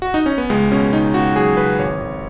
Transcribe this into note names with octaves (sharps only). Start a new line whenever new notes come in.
F#4
D#4
C#4
B3
C#2 G#3
B2 C#4
C#2 D#4
C#2 F#4
F#3 G#4
C#2 B4
G#1 C#5
G#1